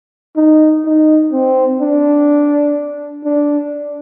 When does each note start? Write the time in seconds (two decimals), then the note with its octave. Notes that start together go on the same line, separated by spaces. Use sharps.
0.36 D#4
0.85 D#4
1.32 C4
1.81 D4
3.25 D4